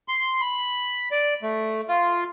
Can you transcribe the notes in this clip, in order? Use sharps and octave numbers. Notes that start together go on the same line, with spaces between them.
C6
B5
D5
A3
F4